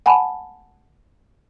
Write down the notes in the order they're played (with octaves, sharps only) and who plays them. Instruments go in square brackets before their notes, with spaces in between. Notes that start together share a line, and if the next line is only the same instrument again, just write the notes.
[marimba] F#5 G#5 A5 B5